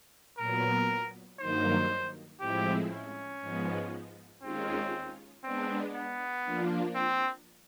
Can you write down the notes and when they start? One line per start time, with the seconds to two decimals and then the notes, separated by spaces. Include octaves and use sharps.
0.38 A#2 F#3 B3 A#4
1.39 G2 D#3 F#3 A#3 D#4 C5
2.40 A2 F3 G#3 C4 E4 G4
2.91 C#4
3.41 G#2 F3 G#3 B3
4.42 D#2 D#3 G#3 C4 C#4 F4
5.43 G#3 B3 C4 D4
5.94 B3
6.44 F3 A#3 D4 F4
6.95 C4